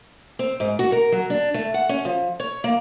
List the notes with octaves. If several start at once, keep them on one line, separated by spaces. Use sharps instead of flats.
C4
G#2
F#4
A#4
F#3
D4
A3
F#5
C#4
F3
C#5
A#3